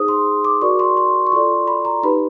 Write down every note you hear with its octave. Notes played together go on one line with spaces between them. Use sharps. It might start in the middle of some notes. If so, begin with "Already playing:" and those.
Already playing: D#4 G#4 C5 D#6
C6
D6
F#4 A#4 D5 C#6
C6
C6
C#6
F4 A4 D5 C6
B5
A#5
D#4 G4 B4 B5